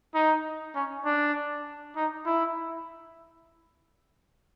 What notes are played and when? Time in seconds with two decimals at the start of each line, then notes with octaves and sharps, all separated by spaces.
0.15 D#4
0.76 C#4
1.05 D4
1.96 D#4
2.26 E4